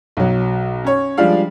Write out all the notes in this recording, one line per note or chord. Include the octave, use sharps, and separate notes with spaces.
B1 F#3
C#4 C#5
F3 G3 G#3 D4 F5